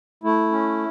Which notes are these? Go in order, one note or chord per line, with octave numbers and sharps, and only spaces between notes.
A3 E4
C#4